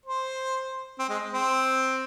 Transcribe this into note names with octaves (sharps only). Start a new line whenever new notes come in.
C5
C4
G#3
C4